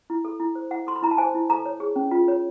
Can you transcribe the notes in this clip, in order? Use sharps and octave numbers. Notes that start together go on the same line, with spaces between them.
E4
A4
E4
C5
E4 F#5
A4 C6
B5
E4 A#5
A5
C5 G#5
E4
A4 A#5
C#5
G#4
C#4
F4
C#5